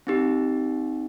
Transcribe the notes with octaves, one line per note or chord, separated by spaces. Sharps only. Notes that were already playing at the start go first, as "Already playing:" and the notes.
C4 D#4 G4